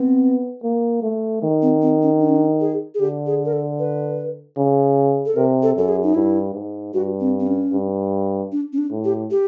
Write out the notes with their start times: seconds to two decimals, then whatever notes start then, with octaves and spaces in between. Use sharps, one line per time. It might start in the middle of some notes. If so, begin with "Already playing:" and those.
Already playing: B3 C4
0.64 A#3
1.03 A3
1.43 D#3
1.62 C4
1.82 C4
2.02 C#4
2.21 D4
2.29 C#4
2.36 D4
2.61 G#4
2.95 G#4
3.00 D3 G4
3.26 G#4
3.45 A#4
3.53 A4
3.79 B4
4.57 C#3
5.26 A4
5.36 C3 A#4
5.63 A4
5.76 F#2 A4
5.89 G#4
6.03 D#4
6.15 G2 E4
6.54 G#2
6.94 G2 F#4
7.20 C4
7.40 C4
7.47 C#4
7.72 G2
8.52 D4
8.73 C#4
8.78 D4
8.91 A2
9.05 G4
9.31 G4